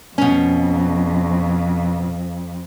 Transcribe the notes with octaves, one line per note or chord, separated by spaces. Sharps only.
F2 B2 C#4